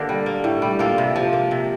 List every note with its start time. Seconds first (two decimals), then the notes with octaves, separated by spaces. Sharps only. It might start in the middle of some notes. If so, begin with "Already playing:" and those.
Already playing: D3 A#3 G4 A#4
0.09 G3
0.26 A#3
0.44 A2
0.62 G3
0.79 A#3 F4 A4
0.98 C3
1.16 F3
1.33 A#3
1.51 C3